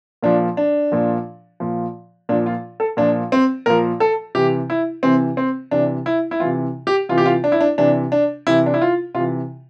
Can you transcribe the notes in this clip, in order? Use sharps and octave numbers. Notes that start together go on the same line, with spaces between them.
A#2 F3 D4
D4
A#2 F3
A#2 F3
A#2 F3 D4
F4
A4
A#2 F3 D4
C4
A#2 F3 A#4
A4
C3 E3 G4
E4
C3 E3 C4
C4
C3 E3 D4
E4
E4
C3 E3 F4
G4
C3 E3 F4
G4
F4
D4
E4
D4
C3 E3 D4
D4
C3 E3 E4
D4
E4
F4
C3 F4
E3